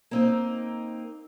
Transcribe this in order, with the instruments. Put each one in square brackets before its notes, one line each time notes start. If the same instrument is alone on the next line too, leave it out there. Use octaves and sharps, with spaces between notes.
[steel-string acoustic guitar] A#3 C4 D#4